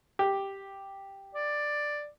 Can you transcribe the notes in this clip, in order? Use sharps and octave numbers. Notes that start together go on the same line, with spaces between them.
G4
D5